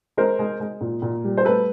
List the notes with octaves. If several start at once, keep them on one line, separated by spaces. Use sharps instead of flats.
G#3 A#4 C5
G#3
G#3
A#2
A#2
G3
C5
A3 A4 B4